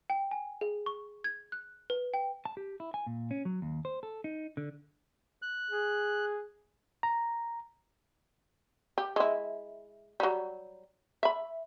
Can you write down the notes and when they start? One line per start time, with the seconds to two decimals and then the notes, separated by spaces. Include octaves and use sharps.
0.10 G5
0.31 G#5
0.61 G#4
0.86 C#6
1.24 G#6
1.52 F#6
1.90 B4
2.14 G5
2.45 A5
2.57 G4
2.80 E4
2.94 G#5
3.06 A#2
3.31 C#4
3.45 F#3
3.62 D#2
3.85 C5
4.03 A4
4.24 D#4
4.57 D3
5.42 F#6
5.71 G#4
7.03 A#5
8.98 G4
9.16 G#3 E4
10.20 F#3 G3
11.23 E5 B5